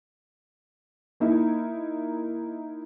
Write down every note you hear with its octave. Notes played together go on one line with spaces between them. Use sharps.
A#3 D#4 E4